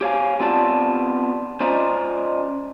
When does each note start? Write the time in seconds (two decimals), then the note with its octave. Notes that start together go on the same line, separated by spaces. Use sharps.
0.01 G4 C#5 F5 G#5
0.40 B3 C4 F4 G4 D5 A5
1.60 C#4 F4 C5 D5 D#5 A#5